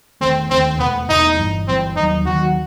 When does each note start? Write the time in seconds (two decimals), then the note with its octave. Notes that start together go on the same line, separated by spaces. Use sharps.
0.21 E1 D#2 D#3 A3 C4
0.50 E1 D#2 D#3 A3 C4
0.79 E1 E2 B2 A3 B3
1.08 E1 E2 B2 A3 D#4
1.37 G1 G2 E3 G3
1.67 G1 G2 E3 G3 C4
1.96 D#2 D#3 F#3 D#4
2.26 D#2 D#3 F#3 F#4